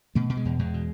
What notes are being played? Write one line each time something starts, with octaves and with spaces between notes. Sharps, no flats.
B2 A3
B2
G#3
E2
E2 G#3
B2